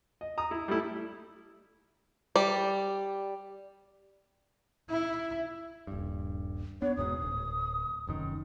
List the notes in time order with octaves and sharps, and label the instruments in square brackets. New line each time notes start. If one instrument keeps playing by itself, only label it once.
[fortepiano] D#5
A#5 D#6
E4
G3 A3 E4
[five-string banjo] G3 D5
[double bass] E4
[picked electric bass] D#1 G2
[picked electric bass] B3 D4 [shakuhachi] C#5
[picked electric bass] E1 G#2 B2 [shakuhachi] D#6
[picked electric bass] D1
F1 F#2 D#3